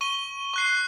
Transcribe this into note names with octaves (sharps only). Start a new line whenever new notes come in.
C#6 D#7 G7
C#6 F#6 C7